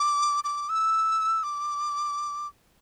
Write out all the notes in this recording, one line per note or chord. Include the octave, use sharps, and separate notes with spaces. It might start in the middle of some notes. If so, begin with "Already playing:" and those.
Already playing: D6
D6
E6
D6